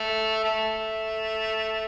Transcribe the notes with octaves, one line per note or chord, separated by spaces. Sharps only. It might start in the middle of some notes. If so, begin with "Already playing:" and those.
Already playing: A3
A3